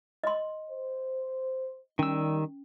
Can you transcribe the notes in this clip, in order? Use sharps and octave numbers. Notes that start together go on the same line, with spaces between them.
D#5 C6
C5
D#3 G3 C#4 E6